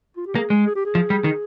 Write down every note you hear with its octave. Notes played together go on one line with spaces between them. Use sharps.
F4
G4
A#3 G#4
G#3
G#4
G4
G#4
F3
G3
D#3